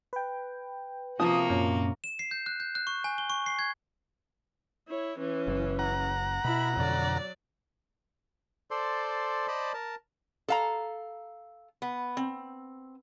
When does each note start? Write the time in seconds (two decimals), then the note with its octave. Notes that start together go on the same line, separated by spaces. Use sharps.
0.13 B4 G5
1.20 C3 F3 A#3 F#4 D#6
1.50 F#2 A#2 C#4
2.04 E7
2.19 C7
2.31 G6
2.46 F#6
2.60 G6
2.75 F#6
2.87 C#6
3.04 G#5
3.18 G7
3.30 C#6
3.46 C7
3.59 G#6
4.88 E4 C#5
5.19 E3 C#4
5.48 F#1
5.79 F#5 A#5
6.44 B2 E4 B5
6.77 F2 B2 D3 F#3 D5
8.71 A4 C5 D5 C6
9.48 C5 D5 D#5 A5 B5
9.74 A#4 A5
10.48 A4 F5 A#5
11.82 B3
12.17 C4